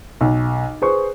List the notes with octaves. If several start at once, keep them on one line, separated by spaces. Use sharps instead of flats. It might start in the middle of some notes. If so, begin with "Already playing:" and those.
B1
G#4 B4 C5 C#6